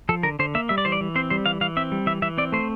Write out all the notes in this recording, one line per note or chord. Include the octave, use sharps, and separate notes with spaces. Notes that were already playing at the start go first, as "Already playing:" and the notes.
F3 A4
D3 A#4
D3 C5
A#3 E5
G3 E5
D5
E3 C5
D5
E3
C4 C5
G3 C5
E3 F5
E3 F5
C4 E5
G3
E3 E5
E3 E5
C4 D5
A3 C5